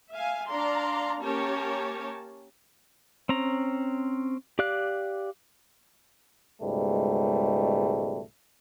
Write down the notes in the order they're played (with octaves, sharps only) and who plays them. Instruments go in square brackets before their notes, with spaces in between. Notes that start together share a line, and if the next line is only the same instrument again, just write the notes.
[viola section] E5 F5 G#5
D4 D5 F5 A#5 C6
A#3 C#4 G4 A#4 C#5 A5
[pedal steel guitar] C4 C#4 A#5
G4 D5 F5 F#6
[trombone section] C#2 G#2 B2 G3 A3